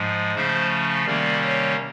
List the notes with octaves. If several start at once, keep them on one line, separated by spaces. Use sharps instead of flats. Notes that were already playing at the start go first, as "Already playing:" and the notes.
Already playing: G#2 F3 G#3
C#3 F3 A3 C#4 C5
C3 D#3 G3 A#3 C#4 D5
C#5